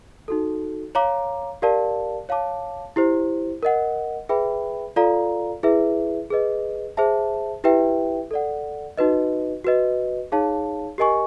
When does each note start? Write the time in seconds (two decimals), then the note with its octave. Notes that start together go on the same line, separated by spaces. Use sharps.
0.28 D#4 F#4 A4
0.95 C#5 F5 A#5 D6
1.62 G4 A#4 D5 F5 A5
2.29 C#5 F5 A5 D6
2.96 E4 G4 C5
3.63 A#4 D#5 F#5
4.29 G#4 B4 E5 G5 B5
4.96 F4 A4 D5 F5 A#5
5.63 E4 G#4 B4 E5
6.30 G#4 B4 D#5
6.97 G#4 C5 E5 A5
7.64 E4 G4 B4 E5 G5
8.31 A4 D5 F#5
8.97 D#4 F#4 B4 D#5
9.64 F#4 B4 D#5
10.32 D#4 G#4 C#5 F5 A5
10.98 G4 A#4 D#5 G#5 C#6